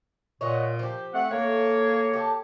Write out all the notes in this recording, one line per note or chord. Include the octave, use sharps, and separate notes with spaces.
A#2 C#5 D#5 F#5
F3 G4
A3 C4 F#5
A2 A#3 C#5
G4 A4